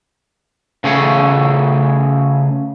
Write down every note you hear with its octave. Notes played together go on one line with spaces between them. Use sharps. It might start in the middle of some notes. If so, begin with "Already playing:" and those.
C#3 A3 G#4 C#5